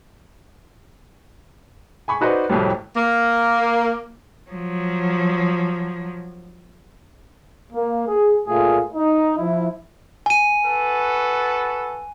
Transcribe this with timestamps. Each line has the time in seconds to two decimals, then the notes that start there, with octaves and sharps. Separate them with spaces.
2.08 G#5 B5 C#6
2.21 D#4 F#4 B4 C5 D5 D#5
2.50 C2 F2 A2 F#3 G3
2.97 A#3
4.51 F3 F#3
7.73 A#3
8.08 G#4
8.47 A#2 A3 F4 G#4
8.95 D#4
9.38 F3 E4
10.26 G#5 D#7
10.65 F#4 A4 B4